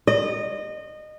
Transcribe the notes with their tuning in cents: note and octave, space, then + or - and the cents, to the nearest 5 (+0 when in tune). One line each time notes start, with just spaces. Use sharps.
D#5 -25